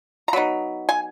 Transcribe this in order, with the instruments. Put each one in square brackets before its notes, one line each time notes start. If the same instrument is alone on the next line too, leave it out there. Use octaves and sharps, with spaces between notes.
[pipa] A#5
F#3 B3 D#4 B5
G#5